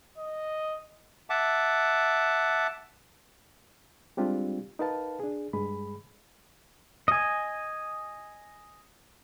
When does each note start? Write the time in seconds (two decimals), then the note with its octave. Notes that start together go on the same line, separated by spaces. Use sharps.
0.18 D#5
1.30 E5 F#5 A5 D6
4.17 G3 G#3 C4 D4 F4 G4
4.79 D#4 F#4 A#4 B4 F5 A5
5.20 D4 G#4
5.53 G2 G#3 G#4 B5
7.08 D#5 G#5